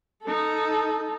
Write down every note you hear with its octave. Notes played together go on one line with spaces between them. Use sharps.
D#4 A4